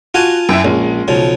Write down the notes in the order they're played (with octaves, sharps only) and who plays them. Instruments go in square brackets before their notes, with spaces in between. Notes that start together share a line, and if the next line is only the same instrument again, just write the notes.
[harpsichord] F4 G#5 A5 [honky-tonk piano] F#4
[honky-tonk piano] F#2 E4 E5 [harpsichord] G5
[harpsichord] A#1 [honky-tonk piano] G#3 C#4
[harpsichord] B1 C#3 F3